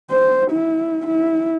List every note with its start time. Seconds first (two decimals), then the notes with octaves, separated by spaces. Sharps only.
0.11 C5
0.51 E4
1.07 E4